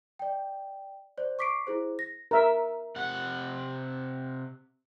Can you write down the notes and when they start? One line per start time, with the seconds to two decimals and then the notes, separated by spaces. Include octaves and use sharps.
0.19 D5 G5
1.18 C5 D5
1.39 C#6 D6 B6 C7 D7
1.67 E4 G#4 C5
1.99 A#6
2.31 A#4 E5
2.96 C3 F#5